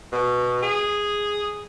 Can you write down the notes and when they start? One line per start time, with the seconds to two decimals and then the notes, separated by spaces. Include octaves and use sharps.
0.12 B2
0.62 G#4